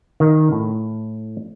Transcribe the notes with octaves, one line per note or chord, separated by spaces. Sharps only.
D#3
A2